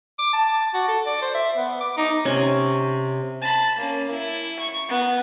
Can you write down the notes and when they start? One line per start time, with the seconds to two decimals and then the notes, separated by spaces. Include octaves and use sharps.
0.19 D6
0.33 A5
0.74 F#4
0.88 A4
1.06 D5
1.22 C5
1.34 E5
1.56 B3
1.80 D6
1.97 D#4
2.25 C3 C#4
3.42 A5 B5
3.77 A#3 C#4
4.12 E4
4.59 C#6
4.89 B3